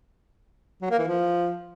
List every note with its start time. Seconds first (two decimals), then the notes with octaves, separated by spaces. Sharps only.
0.82 F#3
0.90 A#3
0.99 E3
1.07 F3